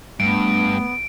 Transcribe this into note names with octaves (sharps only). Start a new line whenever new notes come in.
G2 A3 B3 D7